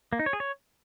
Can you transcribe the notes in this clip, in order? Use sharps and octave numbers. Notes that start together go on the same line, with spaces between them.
A#3
D#4
C#5
G#4
C#5